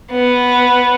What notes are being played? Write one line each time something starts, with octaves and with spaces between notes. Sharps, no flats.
B3